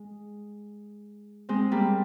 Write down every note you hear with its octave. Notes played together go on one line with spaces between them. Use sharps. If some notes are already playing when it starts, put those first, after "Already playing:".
Already playing: G#3
G#3 C4
G3 A#3